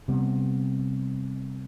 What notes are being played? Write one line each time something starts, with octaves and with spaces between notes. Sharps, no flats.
C3 G3 B3